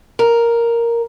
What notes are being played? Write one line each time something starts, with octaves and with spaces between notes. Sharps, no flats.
A#4